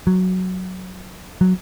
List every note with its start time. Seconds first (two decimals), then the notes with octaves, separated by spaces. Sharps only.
0.07 F#3
1.41 F#3